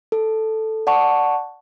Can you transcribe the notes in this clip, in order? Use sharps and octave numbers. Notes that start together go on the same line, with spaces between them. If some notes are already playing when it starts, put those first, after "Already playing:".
A4
D5 F#5 A5 C#6